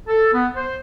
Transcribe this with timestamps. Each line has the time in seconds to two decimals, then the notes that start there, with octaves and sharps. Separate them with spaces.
0.08 A4
0.34 B3
0.56 C5